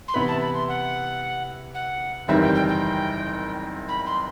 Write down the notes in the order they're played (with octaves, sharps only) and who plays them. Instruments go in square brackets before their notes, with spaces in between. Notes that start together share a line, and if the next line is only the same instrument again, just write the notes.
[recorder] C6
[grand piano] C3 E3 B3 E4 B4 [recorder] B5
[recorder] A5
B5
C6
F#5
F#5
[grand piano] F#1 E2 D#3 G3 C4 [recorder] E5
[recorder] G5
G5
G5
B5
C6